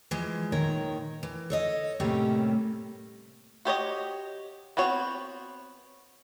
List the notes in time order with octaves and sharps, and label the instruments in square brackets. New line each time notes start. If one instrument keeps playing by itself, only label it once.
[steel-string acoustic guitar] E3 F3 G#3
D#2 A#2 D#3 A#4 C#5
E3
A4 C#5 D#5
A2 C3 G3 A3 A#3 C#4
[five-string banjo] F#4 G4 C#5 D#5
B3 C4 F#4 C#5